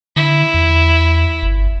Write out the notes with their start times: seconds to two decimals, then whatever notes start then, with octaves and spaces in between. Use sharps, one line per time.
0.16 D3 E4
0.54 E2
1.43 G1